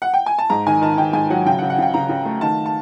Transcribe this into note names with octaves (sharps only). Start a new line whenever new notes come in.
F#5
G5
G#5
A5
G#2 A#5
D#3 G#5
D#3 A5
D#3 G5
G#2 G#5
F#3 F#5
C#3 G5
F#5
C#3
F#5
C#3 G5
C#3 A#5
C#3
A3
D#3 A5
A5